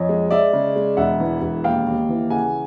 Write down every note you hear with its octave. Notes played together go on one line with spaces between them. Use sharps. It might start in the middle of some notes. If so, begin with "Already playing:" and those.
Already playing: F2 C#5 D#5
G#3
G#3 D5 E5
C#3
G#3
E1 E5 F#5
E3
E1
D#2 F5 G5
D#2
E3
C#3 F#5 G#5